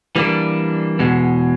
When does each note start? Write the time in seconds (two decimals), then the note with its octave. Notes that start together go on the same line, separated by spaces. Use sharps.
0.16 E3 G3 A#3 D4
0.99 E2 B2 G#3